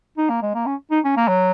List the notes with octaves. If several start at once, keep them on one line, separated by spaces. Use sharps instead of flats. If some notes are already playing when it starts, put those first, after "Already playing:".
D#4
A#3
G#3
A#3
C#4
D#4
C#4
A#3
F#3